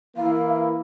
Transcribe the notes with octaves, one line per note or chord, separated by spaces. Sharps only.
E3 A#3 E4 F5